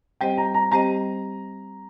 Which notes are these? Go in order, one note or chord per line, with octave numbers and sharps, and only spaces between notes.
G3 C4 G4 C5 D#5 G5
A#5
A#5
G3 C4 G4 C5 D#5 A#5